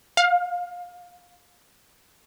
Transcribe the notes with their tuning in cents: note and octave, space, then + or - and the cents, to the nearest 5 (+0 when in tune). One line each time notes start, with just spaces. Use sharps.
F5 +25